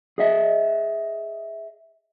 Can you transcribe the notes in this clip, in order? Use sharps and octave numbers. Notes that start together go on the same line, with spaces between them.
G#4 D#5 E5